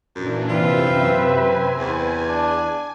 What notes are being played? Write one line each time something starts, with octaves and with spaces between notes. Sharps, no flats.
F#2 A#2 E3 D4
F#2 C3 C4 F4 B4 E5
G#5
E2
D4